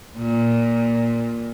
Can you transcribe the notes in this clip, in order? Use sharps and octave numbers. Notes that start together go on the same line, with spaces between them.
A#2